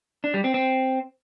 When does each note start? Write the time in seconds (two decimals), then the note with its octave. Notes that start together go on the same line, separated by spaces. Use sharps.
0.24 D4
0.34 G3
0.44 C4
0.54 C4